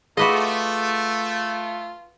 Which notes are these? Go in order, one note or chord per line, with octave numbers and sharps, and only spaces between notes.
A3 F4 F#4 G#4 B4 D#5 D6